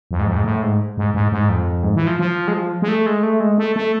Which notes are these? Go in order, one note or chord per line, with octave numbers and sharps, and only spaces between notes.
F2
G#2
F2
G#2
A2
G#2
G#2
G#2
G#2
F2
G#2
E3
F3
F3
G#3
F3
G#3
A3
G#3
A3
G#3
A3
A3